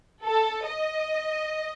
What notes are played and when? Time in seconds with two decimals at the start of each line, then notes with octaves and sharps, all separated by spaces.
0.24 A4
0.69 D#5